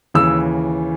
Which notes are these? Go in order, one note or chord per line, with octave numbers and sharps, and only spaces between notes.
D#2 C#3 E3 E6